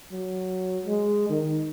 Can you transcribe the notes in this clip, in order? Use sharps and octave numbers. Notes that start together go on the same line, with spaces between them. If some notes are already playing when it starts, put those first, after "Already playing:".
F#3
G#3
D#3